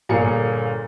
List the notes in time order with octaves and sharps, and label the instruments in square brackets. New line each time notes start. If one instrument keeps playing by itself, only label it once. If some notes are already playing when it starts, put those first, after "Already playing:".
[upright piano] G1 A#2 G#4 A#4 F5 C#7